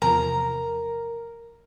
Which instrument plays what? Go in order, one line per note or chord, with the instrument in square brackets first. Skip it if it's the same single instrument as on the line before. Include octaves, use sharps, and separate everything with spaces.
[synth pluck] E2 C3 F3 [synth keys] A#4 [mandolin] A#5